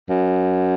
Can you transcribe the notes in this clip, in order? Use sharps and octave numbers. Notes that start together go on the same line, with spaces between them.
F#2